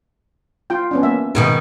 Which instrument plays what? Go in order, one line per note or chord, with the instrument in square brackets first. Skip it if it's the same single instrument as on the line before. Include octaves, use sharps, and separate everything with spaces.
[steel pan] F4 G5
B3 C#4 D4
A#3 E5
[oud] G#2 B2 D#3